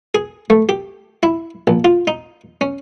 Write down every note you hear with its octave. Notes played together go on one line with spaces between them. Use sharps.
G#4
A3
G4
E4
A#1
F4
D#4
C#4